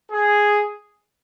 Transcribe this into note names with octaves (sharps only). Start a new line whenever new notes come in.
G#4